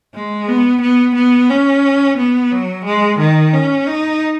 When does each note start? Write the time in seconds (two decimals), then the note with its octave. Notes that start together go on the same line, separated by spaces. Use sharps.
0.14 G#3
0.48 B3
0.82 B3
1.15 B3
1.50 C#4
2.18 B3
2.51 F#3
2.85 G#3
3.19 D#3
3.53 C#4
3.86 D#4